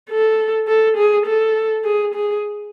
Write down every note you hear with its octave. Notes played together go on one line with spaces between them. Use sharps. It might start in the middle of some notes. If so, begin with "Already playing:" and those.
A4
A4
G#4
A4
G#4
G#4